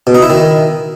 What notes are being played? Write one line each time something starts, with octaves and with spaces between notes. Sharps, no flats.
B2
D#4
E4
D#3